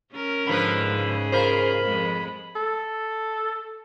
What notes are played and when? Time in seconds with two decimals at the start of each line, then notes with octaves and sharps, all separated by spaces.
0.13 C#4 A#4
0.47 G#2 D3 F3 B4 B5
0.90 C#3 G#4
1.32 F4 A#4 C5 B5
1.85 F2 G#3
2.56 A4